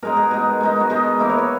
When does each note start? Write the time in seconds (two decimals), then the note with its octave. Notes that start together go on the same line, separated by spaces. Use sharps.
0.03 B2 G#3 D#4 A#4
0.17 G#4
0.31 B2 G#3 D#4
0.61 B2 G#3 D#4
0.80 F#4
0.89 B2 G#3 D#4 G#4
1.19 E3 A#3 E4
1.30 C#5
1.38 B4